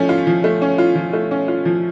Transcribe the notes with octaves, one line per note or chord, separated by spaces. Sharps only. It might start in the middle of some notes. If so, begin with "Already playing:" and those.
Already playing: F3 A3 C#4
F4
F3
A3
C#4
F4
F3
A3
C#4
F4
F3